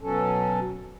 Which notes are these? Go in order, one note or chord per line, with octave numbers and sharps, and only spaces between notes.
B2 F#3 C#4 A4